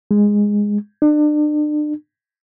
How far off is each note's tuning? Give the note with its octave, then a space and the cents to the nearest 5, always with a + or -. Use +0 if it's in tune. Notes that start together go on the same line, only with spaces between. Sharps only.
G#3 -10
D4 +35